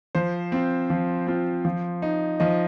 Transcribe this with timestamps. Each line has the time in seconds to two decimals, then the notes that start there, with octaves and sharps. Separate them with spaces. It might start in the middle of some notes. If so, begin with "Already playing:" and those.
0.15 F3 C5
0.52 C4 F4
0.90 F3
1.27 C4 F4
1.65 F3
2.02 D#4
2.40 F3 D#5